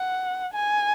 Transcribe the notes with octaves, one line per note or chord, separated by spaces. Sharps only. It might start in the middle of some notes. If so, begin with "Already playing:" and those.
Already playing: F#5
G#5